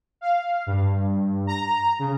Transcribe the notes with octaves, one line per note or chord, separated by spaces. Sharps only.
F5
G2
A#5
C#3